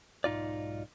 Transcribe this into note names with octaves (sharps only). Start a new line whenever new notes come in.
B1 G#2 D#4 F4 D5